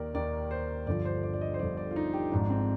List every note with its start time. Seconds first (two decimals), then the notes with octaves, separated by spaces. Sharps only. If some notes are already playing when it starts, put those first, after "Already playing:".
Already playing: D#2 D#3 A#4 D5
0.14 D#2 D#3 D5
0.51 C5
0.87 G1 G2 D3 F3 D5
1.05 C5
1.23 D5
1.34 D5
1.41 D#5
1.54 C5
1.59 G1 G2 D3 F3 D5
1.77 D5
1.91 F4
1.96 D#4
2.14 G4
2.32 G#1 G#2 F3 D4
2.50 C4